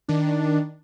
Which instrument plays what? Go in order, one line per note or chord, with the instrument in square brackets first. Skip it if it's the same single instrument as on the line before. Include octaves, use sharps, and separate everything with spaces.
[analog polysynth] D#3 D4